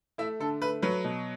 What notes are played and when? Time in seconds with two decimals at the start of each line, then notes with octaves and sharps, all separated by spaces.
0.18 A3 E4 E5
0.40 D3 A4
0.62 A3 B4
0.82 F#3 B4
1.04 B2